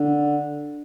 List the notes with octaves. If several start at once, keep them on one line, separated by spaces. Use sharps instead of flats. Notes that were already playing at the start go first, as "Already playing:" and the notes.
Already playing: D3